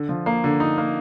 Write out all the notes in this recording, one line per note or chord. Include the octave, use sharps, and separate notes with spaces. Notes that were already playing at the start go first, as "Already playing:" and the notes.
Already playing: D3
F3
A#3
D3
D#4
A#3